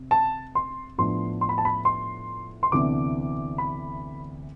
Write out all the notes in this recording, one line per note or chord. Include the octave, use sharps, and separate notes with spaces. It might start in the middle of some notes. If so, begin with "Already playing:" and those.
Already playing: C3
A5
C6
A2 F3 B3 D4 C6
C6
B5
A5
B5
C6
C6
D2 C3 E3 B3 D4 D6
B5